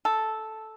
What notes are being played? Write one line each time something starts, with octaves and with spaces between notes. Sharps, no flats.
A4